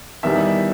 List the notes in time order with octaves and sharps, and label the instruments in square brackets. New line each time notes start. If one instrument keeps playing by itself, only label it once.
[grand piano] E2 D#3 G3 E5